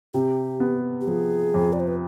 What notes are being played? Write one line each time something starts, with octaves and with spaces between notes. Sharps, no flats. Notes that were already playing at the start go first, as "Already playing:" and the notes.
C3 G4
B3
G4
F3 G#4
F2
D5
C5
B4